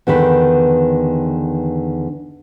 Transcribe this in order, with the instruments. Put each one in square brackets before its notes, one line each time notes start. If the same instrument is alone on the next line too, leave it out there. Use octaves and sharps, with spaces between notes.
[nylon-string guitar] E2 D3 D#3 B4